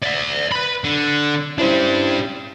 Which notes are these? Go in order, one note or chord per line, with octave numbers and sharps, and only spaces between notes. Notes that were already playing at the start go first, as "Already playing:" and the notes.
D5 E5
B4 B5
D3
C#4 D4 E4 G4 C5